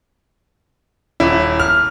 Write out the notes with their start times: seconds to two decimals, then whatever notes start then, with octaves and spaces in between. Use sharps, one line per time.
1.20 D#1 E4
1.60 F6